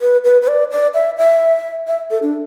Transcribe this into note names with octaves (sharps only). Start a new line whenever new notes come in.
B4
B4
B4
D5
D5
E5
E5
E5
A4
D4